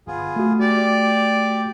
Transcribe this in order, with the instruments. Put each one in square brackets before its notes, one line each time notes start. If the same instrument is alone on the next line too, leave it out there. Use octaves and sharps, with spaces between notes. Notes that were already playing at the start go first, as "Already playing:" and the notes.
[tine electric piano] G1 [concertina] B3 F4 G#4
[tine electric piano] A3 F#4
[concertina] G4 [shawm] D5